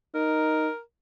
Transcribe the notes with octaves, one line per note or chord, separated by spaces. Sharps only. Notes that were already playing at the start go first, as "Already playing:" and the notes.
D#4 A#4